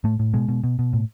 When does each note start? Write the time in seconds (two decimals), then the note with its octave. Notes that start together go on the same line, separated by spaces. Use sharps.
0.04 A2 A3
0.19 A2
0.33 B2 G#3
0.48 B2
0.64 B2
0.79 B2
0.93 A2